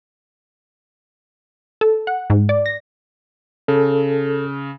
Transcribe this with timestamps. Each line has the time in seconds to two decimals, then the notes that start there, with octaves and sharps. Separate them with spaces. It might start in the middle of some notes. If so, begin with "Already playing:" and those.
1.81 A4
2.07 F#5
2.30 G#2
2.49 D5
2.66 A#6
3.68 C#3 A4